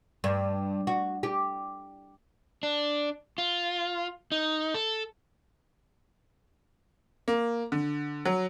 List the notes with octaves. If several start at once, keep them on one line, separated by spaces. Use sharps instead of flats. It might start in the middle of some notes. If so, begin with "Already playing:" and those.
G2
F#4
G4
D4
F4
D#4
A4
A#3
D3
F#3